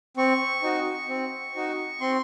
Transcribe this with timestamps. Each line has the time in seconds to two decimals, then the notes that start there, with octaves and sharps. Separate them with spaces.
0.17 C4 C#6
0.63 D#4 F#4
1.09 C4
1.55 D#4 F#4
2.01 C4 C6